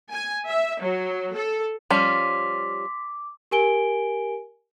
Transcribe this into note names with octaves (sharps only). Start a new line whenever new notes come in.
G#5
E5
F#3
A4
F3 G3 C#4 C6 D6 B6
G4 A#4 G#5 D7 G7